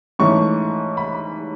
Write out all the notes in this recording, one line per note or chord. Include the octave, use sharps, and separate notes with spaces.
G#2 E3 A3 C#4 C#6
B5